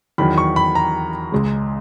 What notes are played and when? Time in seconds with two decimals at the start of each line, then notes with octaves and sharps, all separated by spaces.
0.18 E2 D#3 F#3 B5
0.38 C#6
0.56 B5
0.75 A#5
1.32 C#2 C#3 G#3